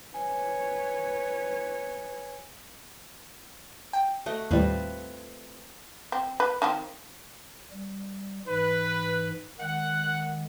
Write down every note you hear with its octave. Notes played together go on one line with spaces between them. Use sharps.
B4 C#5 G#5
G5
A3 F#4 D#5
D#2 A2 G3 C4 F4 B4
C4
B4
D#3 F3 C4
G3
G#2 E3 B4
D#3 G#3 F#5